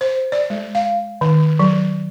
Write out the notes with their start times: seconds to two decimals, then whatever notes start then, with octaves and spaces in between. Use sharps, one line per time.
0.01 C5
0.32 D5
0.50 G#3
0.75 F5
1.21 D#3
1.59 F#3